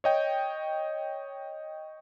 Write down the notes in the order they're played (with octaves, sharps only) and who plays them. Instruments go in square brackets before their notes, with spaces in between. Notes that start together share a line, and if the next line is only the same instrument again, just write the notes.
[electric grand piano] C#5 D#5 G5